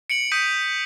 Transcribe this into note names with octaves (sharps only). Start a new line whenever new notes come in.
C#7 D7 F#7
D#6 G6 B6 C#7 D#7